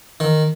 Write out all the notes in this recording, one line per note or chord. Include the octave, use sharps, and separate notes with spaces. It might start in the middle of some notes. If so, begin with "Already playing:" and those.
D#3